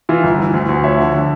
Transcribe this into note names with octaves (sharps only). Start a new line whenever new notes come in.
E3 F4
G1
E3
D2
D2
F3 C#5 E5
D3
D3